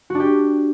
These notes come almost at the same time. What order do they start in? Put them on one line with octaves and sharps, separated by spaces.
F#4 D4 G4